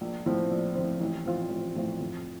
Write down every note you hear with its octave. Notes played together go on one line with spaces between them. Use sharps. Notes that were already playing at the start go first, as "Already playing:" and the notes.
A#1
A2 F3 C4
A#1
A2 F3 C4
A1
A2 F3 C4 F4
A1
A2 F3 C4 F4
F2